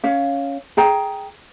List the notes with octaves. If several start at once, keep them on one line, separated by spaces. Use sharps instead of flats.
C#4 F5
G#4 G5 A#5